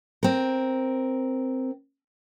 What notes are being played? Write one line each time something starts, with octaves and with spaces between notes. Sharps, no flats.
C4 A#4